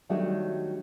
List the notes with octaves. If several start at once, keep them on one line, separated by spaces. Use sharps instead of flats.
D#3 F#3 G3 A3 D4 F#4